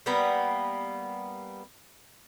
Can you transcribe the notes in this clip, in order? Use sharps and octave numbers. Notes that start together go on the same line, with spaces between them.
G3 A#3 B3